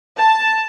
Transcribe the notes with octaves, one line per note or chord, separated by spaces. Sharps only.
A5